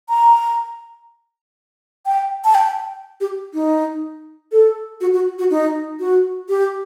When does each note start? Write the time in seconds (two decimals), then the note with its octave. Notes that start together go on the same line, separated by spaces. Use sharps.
0.09 A#5
2.06 G5
2.45 A5
2.54 G5
3.20 G4
3.54 D#4
4.52 A4
5.01 F#4
5.13 F#4
5.38 F#4
5.50 D#4
6.00 F#4
6.49 G4